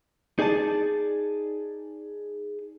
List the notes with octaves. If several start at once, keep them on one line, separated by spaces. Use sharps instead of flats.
D#4 G#4 D5 G#5 A5